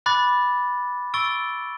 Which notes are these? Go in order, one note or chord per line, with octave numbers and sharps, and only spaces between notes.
B5 D6 F#6 A6
C#6 E6 A6 D7 G7